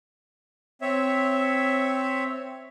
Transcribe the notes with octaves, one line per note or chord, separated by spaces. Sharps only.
C4 C#5 E5